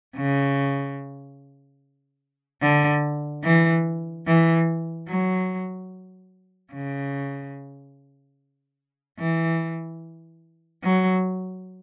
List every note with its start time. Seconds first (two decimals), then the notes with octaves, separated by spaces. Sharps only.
0.17 C#3
2.63 D3
3.44 E3
4.27 E3
5.08 F#3
6.73 C#3
9.19 E3
10.84 F#3